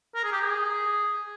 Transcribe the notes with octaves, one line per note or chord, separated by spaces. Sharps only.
A#4
G#4
G4
G#4